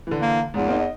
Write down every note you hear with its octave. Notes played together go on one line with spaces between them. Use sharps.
D3 E3
A#3
E2 G#2 F3
A#3 C4 D#4
D#5